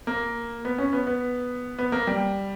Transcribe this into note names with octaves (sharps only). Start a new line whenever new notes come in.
A#3
B3
C#4
B3
B3
B3
A#3
G3